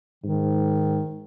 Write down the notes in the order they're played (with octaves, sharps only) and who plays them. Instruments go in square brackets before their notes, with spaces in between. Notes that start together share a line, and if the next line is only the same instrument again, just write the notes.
[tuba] G#2 [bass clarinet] D#3